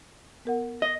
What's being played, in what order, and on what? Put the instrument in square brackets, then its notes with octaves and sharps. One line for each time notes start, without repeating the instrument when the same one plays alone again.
[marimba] B3 A#4 F#5
[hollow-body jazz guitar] D#5